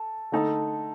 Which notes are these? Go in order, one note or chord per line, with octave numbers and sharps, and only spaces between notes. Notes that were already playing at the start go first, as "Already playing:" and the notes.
Already playing: A4
D3 A3 D#4 A4